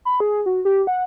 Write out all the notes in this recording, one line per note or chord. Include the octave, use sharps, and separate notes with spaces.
B5
G#4
F#4
G4
F#5